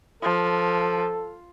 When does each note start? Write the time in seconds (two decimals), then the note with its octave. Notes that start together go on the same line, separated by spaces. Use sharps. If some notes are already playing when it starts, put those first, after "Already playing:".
0.22 F3 A4